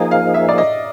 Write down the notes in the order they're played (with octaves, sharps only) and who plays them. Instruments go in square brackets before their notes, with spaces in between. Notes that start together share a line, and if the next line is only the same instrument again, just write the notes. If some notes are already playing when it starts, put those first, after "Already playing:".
Already playing: [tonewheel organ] F3 A#3 D#4 G#4
[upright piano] F5
E5
D5
D#5